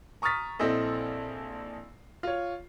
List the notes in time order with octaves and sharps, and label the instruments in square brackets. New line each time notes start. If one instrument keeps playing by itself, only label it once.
[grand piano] A#5 C#6 D#6 F6 A6 B6
A#1 C4 E4 A4 D#5
F4 C#5